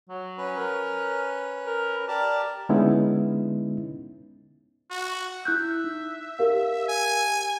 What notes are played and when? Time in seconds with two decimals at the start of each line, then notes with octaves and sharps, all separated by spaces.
0.09 F#3
0.38 C#4 B4
0.57 A#4
1.66 A#4
2.08 G4 A#4 D5 A5
2.69 D3 G#3 B3 C#4 D#4 E4
4.90 F#4
5.45 E4 E5 F#6 G6
5.84 D#4
6.39 G4 A#4 F5
6.88 G#5